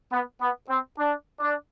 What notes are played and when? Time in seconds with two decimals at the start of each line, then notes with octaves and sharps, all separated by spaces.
0.12 B3
0.41 B3
0.68 C4
0.98 D4
1.40 D4